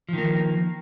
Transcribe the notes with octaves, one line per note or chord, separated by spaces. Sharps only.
D#3 F3 A#3